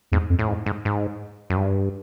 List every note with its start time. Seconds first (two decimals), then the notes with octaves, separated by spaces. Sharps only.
0.12 E2 G#2
0.30 F2
0.39 A2
0.48 G#2
0.66 G#2
0.85 G#2
1.50 F#2
1.57 G2